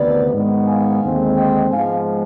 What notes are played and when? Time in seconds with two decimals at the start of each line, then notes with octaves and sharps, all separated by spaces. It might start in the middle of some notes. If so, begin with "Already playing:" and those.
Already playing: D2 C3 D#3 B3 B4 D5
0.33 G#2 D#3 B3
0.67 F5 G#5
1.02 D#2 D3 G#3 C4
1.37 D#5 G5
1.71 G#2 F3 G#3 B3 F5 G#5